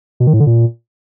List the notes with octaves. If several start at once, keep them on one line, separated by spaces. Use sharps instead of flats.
B2
D#3
A2
D3
A#2